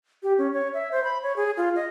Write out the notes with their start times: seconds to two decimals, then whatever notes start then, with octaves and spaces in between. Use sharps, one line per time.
0.23 G4
0.38 C#4
0.54 C#5
0.74 E5
0.92 C5
1.04 B5
1.23 C#5
1.36 G#4
1.57 F4
1.76 D#5